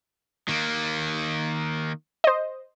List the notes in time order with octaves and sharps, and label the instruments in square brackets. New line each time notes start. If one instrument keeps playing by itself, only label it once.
[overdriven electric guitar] D#3 A#3
[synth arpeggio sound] C5 D#5